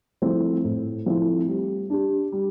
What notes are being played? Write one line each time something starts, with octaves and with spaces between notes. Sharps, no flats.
F3 A3 C4 E4
A2
F3 A3 C4 E4
G3
D4 G4
G3